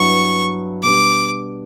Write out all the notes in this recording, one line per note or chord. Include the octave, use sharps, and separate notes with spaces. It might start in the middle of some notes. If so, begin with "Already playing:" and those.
Already playing: G2 F#3 B3 E4 C#6
B2 G3 B3 D4 G4 D6